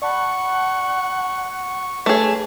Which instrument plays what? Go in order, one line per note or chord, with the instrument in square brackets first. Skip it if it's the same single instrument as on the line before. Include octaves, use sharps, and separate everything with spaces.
[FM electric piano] D5 A5 B5 [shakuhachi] F#5 [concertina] C#6
[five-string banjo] A3 G#4 [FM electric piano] B4 C#5